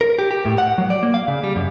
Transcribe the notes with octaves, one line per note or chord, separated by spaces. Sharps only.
A#4
G4
G4
A2
F#5
F#3
D5
A#3
F5
C#3
G3
F#2